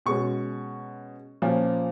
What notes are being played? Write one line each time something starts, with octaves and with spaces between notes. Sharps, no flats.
B2 G#3 C#4 C#6
A#2 F3 A#3 C#4